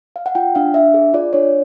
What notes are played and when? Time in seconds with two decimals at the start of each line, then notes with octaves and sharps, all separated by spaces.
0.16 F5
0.26 F#5
0.35 F4 G5
0.55 D4 F5
0.74 D4 E5
0.94 G#4
1.14 F4 D5
1.33 D4 C#5